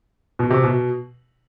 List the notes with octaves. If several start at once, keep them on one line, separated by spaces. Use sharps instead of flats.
B2
C3
B2